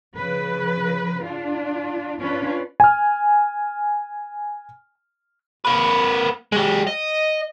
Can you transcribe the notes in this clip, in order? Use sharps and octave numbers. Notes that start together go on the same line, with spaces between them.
C#3 F3 B4
D4 F4
C#4 D4 F4 B4
G#5 F6
A#3 B4
G#3 G4
D#5